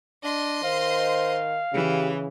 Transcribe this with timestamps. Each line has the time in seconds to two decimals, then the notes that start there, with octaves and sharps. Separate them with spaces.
0.24 D4 D#5 C6
0.64 D#3 C5 F5
1.73 C#3 E3 G4